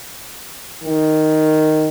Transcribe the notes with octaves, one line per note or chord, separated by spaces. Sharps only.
D#3